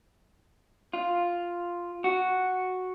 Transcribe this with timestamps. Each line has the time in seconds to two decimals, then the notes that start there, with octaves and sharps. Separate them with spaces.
0.93 F4
2.04 F#4